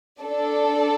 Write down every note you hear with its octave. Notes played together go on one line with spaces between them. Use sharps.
D4 A4 D5